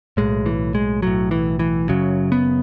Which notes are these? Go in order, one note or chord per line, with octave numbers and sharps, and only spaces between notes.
B1 A2 G#3
E3
G#3
B1 A2 F#3
E3
E3
F#1 F#2 C#3 F#3
B3